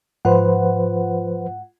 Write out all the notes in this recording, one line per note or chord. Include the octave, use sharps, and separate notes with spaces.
G#2 F3 F4 B4 C5 F#5